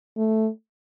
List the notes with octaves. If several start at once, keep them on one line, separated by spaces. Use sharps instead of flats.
A3